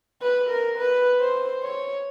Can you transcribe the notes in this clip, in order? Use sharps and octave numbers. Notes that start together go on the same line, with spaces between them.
B4
A#4
B4
C5
C#5